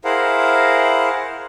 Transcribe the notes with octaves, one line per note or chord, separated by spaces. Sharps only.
E4 G#4 A#4 C5 F5 F#5